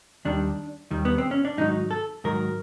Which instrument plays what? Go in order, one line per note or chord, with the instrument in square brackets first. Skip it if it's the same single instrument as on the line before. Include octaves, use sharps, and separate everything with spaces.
[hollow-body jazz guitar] D#2 D#3 G3 D4
D#2 D#3 G3
B3
C4
C#4
D4
G#2 D#3 F#3 D#4
A4
G#2 D#3 F#3 A#4